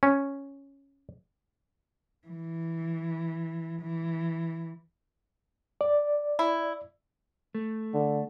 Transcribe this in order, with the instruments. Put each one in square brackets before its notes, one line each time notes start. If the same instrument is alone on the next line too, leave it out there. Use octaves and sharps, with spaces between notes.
[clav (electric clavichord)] C#4
[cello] E3
E3
[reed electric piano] D5
[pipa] E4
[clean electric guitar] A3
[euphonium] D3